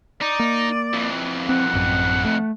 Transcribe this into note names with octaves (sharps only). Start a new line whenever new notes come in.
D#4 D5
A#3
F2 E3
C4 F#5
A1 F#2
A3